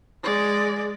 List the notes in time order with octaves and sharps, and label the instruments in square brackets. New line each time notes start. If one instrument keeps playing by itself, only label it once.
[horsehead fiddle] G#3 D5